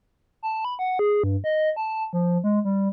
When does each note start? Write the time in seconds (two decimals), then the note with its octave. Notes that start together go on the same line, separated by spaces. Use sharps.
0.43 A5
0.65 B5
0.79 F#5
0.99 G#4
1.24 G2
1.44 D#5
1.76 A5
2.13 F3
2.44 G#3
2.65 G3